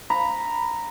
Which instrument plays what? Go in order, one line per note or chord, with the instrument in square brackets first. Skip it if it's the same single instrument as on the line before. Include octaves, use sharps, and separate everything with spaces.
[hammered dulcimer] A#5 [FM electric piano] B5